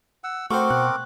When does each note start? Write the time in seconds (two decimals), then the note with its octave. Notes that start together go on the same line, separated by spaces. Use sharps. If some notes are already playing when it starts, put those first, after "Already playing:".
0.24 F#5 E6
0.51 A3 C4 F#4 A#4 C5 G5 C#6 D6
0.70 B2 F#6